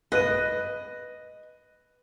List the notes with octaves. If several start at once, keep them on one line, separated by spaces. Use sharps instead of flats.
B4 D#5 F#6 D#7